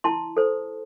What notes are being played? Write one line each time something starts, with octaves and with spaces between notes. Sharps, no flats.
E4 A5 C6
A4 C5